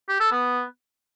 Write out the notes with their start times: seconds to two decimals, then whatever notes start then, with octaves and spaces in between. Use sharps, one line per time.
0.09 G4
0.20 A4
0.32 B3